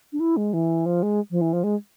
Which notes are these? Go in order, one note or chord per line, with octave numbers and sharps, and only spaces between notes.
D4
E4
G#3
E3
F3
G#3
F3
E3
F3
G#3